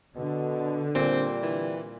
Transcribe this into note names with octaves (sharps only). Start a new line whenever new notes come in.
B2 D3
A#2 G3 C4
E3